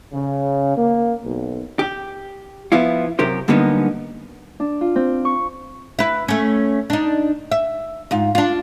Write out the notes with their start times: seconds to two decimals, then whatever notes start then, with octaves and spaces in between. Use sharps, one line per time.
0.13 C#3
0.77 A#3
1.24 B1
1.79 G4
2.72 F3 B3 E4 F4
3.19 F#2 C3 G4 A#4 C5
3.48 F#2 D3 G3 A#3 B3 D#4
4.60 D4
4.81 F4
4.96 C4
5.25 C#6
5.99 E4 B4
6.28 A3 C#4
6.90 D4 D#4
7.51 E5
8.11 G#2 F4
8.35 D4 F4